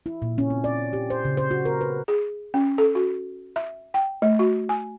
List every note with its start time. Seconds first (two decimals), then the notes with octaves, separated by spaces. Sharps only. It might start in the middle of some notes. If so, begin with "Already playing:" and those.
0.06 E4
0.22 A#2
0.38 C#4
0.50 C4
0.64 D5
0.93 G4
1.10 C5
1.25 C#3
1.37 C5
1.51 F#4
1.65 A#4
1.81 B4
2.08 G#4
2.54 C#4
2.78 A4
2.95 F#4
3.56 E5
3.94 G5
4.22 A3
4.39 F#4
4.69 G#5